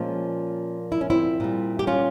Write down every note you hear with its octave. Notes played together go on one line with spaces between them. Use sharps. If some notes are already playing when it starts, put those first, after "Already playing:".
Already playing: A#2 F3 G#3 A#3 C#4
E4
C#4
C4 E4
A#2 G3
G4
C#4 F4